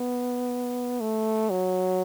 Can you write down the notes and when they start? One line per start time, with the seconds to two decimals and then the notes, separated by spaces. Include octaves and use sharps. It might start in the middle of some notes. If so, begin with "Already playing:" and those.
Already playing: B3
1.01 A3
1.50 F#3